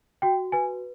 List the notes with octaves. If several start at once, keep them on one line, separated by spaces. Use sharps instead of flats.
F#4 G5
B4 G#5